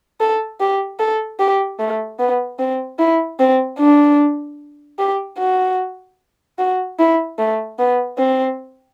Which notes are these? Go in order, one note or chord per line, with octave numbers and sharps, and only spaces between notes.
A4
G4
A4
G4
A3
B3
C4
E4
C4
D4
G4
F#4
F#4
E4
A3
B3
C4